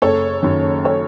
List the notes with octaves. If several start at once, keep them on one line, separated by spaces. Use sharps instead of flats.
F#1 A4 C#5
F#2 D#3
A4 C#5